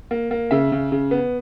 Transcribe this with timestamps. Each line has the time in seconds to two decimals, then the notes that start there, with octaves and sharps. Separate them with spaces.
0.11 A#3
0.31 A#3
0.51 C#3 E5
0.72 C#3
0.92 C#3
1.11 B3